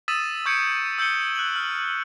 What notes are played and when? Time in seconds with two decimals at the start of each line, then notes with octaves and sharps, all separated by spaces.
0.08 D#6 E6 A6 B6 D#7 E7
0.45 C#6 E6 G6 G#6 C#7 D7
0.98 E6 G6 C#7 G7
1.35 F#6 F#7
1.56 F6